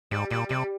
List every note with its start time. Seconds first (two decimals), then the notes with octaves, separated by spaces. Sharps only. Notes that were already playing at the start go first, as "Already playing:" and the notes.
0.11 G#2 G3
0.30 A#2 G3
0.49 C3 G3